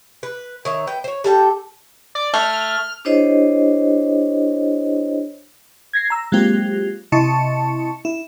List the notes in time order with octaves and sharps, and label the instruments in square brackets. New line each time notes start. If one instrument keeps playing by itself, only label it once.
[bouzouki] B4
D#3 C#5 E5
B3 G5
C5 C#5
G3 A4 G5
[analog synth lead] D5
[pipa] A3 [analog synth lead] F6
[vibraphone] D4 E4 G4 C5 C#5 D#5
[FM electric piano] G#6 A#6 C7
A#5 E6
F#3 G#3 A#3 C4 F4 G4
C3 E4 D#5 A5 C#6 C#7
E4